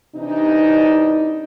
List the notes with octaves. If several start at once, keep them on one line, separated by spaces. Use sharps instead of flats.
C3 E3 D4 D#4